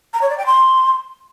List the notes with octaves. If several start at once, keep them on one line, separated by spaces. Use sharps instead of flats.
A#5
C#5
D5
G5
C6